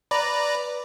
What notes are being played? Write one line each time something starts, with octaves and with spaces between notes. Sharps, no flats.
B4 D5 A#5